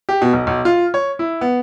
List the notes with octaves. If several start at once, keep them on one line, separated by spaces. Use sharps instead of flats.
G4
B2
B1
B1
F4
C#5
E4
B3